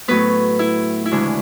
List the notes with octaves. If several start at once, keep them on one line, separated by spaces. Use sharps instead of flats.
A2 F#3 B3 B4
E4
E4
D2 C#3 E3 G#3 D4